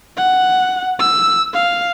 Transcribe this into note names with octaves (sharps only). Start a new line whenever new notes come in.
F#5
E6
F5